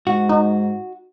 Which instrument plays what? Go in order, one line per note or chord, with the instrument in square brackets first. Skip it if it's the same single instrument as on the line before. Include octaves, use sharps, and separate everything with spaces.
[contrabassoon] G#2 [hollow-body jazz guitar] F#4
[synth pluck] D#4